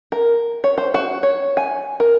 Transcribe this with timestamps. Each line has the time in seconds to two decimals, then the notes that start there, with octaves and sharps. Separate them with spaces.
0.12 A#4
0.64 C#5
0.78 C5
0.94 F#4
1.23 C#5
1.57 G#5
2.00 A#4